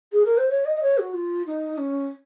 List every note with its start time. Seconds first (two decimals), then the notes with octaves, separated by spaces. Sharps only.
0.13 G#4
0.25 A#4
0.37 C5
0.50 C#5
0.65 D#5
0.76 D#5
0.83 C#5
0.98 F#4
1.14 F4
1.47 D#4
1.78 C#4